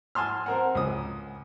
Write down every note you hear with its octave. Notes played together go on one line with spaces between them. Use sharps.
G#5 A5 C6 F6
C4 A#4 F#5
C#2 D#6